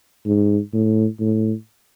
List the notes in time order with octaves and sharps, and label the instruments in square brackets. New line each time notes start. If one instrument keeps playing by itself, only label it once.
[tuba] G#2
A2
A2